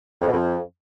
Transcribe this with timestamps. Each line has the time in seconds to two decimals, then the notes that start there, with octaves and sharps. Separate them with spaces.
0.22 F2
0.28 B2
0.34 F2